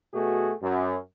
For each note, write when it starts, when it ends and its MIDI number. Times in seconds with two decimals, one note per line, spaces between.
0.14 0.52 47
0.14 0.52 57
0.14 0.52 66
0.14 0.52 68
0.62 0.96 42